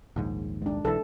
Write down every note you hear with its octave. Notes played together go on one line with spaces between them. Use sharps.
A#1 D#2 G#2
G#3 D4
B1 E3 A4